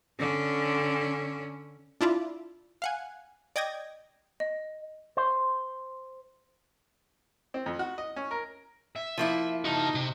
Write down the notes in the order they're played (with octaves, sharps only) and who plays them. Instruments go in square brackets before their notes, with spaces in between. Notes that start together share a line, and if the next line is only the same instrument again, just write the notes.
[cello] D3 C#4
[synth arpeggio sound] D4 E4 F4 D5
F5 F#5 G#5
D5 D#5 G5 G#6 A#6
[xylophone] D#5
[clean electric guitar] C5
[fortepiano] C4
F2
F#4
D#5
C#4
A#4
[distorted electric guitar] E5
[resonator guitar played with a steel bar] F3 A#3 E4
[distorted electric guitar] D#4 [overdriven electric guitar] F#4 A5
[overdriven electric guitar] C3